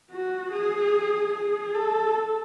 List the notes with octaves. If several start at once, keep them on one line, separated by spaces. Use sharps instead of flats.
F#4
G#4
G#4
A4